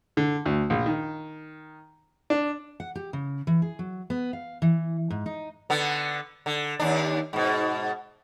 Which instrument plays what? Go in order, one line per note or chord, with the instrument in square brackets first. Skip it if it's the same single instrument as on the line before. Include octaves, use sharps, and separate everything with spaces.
[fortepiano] D3
D2
A#1
D#3
D4
[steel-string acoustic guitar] F#5
G4
C#3
E3
G#4
F#3
B3
F5
E3
G#2
D#4
[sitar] D3 B3
D3
D#2 D4
G#2 B2